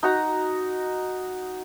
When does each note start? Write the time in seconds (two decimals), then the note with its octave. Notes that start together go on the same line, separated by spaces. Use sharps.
0.03 D#4 F#4 A#5